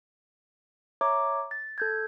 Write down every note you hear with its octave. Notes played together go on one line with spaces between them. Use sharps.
C#5 E5 A#5 D6
A6
A4 G6 G#6